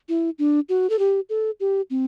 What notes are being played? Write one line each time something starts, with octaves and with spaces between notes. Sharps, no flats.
E4
D4
F#4
A4
G4
A4
G4
C4